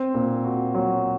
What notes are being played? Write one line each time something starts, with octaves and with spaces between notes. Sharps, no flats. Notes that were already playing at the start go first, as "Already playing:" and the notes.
Already playing: C4
A#2
F#4
F#3